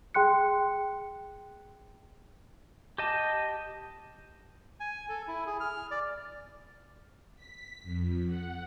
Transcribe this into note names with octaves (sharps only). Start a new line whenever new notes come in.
G#4 G5 C6 F#6 C#7
G4 D#5 A5
G#5
A4
E4
G#4
F6
D5
B6
F2
F#5